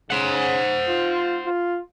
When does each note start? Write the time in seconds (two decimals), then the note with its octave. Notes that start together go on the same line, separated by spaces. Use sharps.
0.10 C#3 C5 F#5
0.89 F4
1.46 F4